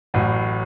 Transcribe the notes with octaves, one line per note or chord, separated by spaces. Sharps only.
A1 A2 F#3